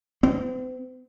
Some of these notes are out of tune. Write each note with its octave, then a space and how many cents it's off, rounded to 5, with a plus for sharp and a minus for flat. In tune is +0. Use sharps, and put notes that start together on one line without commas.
C4 -45